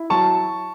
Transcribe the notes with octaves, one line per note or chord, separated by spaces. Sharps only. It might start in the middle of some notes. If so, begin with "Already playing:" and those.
Already playing: E4
F#3 A5 C#6